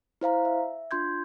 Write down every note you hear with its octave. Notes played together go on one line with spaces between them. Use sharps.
E4 C5 F5 A#5
E5
D4 F4 C6 G6 G#6